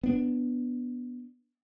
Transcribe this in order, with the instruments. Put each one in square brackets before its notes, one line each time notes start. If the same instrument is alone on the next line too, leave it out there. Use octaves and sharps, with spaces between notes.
[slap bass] B3 D4